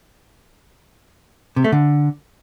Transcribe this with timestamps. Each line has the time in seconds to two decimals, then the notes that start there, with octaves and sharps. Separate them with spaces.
1.56 C3
1.64 A3
1.72 D3